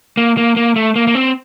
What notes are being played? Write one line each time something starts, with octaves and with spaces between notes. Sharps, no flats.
A#3
A#3
A#3
A3
A#3
A#3
C4